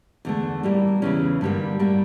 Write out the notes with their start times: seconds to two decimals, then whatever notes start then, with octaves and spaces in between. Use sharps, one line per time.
0.25 E2 D3 A3
0.63 A2 G3 A#3
1.02 E2 C#3 E3 C#4
1.41 G2 D3 G3 A#3
1.79 A2 G3 A#3